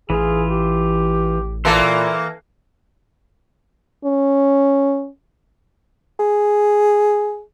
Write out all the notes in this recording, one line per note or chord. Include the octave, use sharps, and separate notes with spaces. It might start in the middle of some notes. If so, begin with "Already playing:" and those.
A1 E3 F4 G#4
G4
A#2 E3 A#3 A4 E5 C6
C#4
G#4